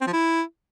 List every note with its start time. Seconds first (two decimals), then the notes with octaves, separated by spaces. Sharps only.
0.01 C4
0.07 F3
0.13 E4